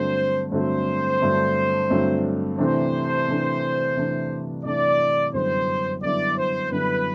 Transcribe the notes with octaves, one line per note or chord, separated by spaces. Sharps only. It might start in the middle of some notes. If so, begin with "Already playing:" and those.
Already playing: G2 D3 F#3 A3 C4 C5
G2 D3 F#3 A3 C4 C5
G2 D3 F#3 A3 C4
G2 D3 F#3 A3 C4
C3 E3 A3 D4 C5
C3 E3 A3 D4
C3 E3 A3 D4
C3 E3 A3 D4 D5
F#2 D3 G3 B3 E4 C5
F#2 D3 G3 B3 E4 D5
C5
F#2 D3 G3 B3 E4 B4